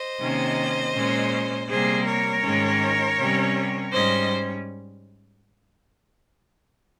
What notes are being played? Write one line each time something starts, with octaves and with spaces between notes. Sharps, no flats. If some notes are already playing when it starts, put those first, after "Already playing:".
Already playing: C5 D#5
C3 D#3 A#3 C#4
A#2 G#3 C#4
C3 G3 A#3 G#4 C5
A#4 C#5
G#2 D#3 G#3 C#4
C3 G3 C#4
G#2 G3 C#4 C5 D#5